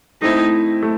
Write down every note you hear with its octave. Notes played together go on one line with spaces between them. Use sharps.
A3 C4 D#4 E4
A3